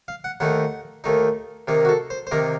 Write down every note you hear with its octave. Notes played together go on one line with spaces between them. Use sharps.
F5
F#5
D#2 D#3 A3 D#4 F#5
D#2 D#3 A3 D#4
C3 D#3 A#3 D#4
F#4
A4
C5
C5
C3 D#3 A#3 D#4 A#4